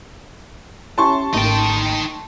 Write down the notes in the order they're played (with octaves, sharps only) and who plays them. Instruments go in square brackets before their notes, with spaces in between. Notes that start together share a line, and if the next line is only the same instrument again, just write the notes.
[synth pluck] C#4 E4 G4 [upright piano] A5 C6 C#6
[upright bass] G#1 [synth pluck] A3 A#3 A6 [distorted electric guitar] D#4 G5